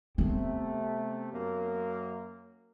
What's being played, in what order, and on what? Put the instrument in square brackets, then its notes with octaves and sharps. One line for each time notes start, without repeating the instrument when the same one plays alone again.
[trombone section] C3 A3 [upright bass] B3 C4
[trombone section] F#2 A#3